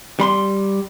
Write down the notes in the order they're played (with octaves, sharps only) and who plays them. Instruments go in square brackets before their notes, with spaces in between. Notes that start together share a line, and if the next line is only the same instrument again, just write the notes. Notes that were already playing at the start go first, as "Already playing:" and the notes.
[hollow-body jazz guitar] G3 B5 C6